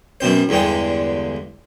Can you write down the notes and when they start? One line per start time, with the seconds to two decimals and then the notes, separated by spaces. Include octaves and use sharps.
0.21 F#2 B2 C4 C5
0.49 E2 G2 D3 G#3 G5